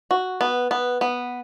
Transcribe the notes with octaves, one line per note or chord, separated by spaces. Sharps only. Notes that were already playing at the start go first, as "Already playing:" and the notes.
F#4
B3
B3
B3